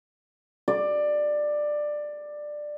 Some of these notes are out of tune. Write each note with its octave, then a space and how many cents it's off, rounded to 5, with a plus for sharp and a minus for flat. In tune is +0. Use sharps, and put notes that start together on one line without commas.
D5 +15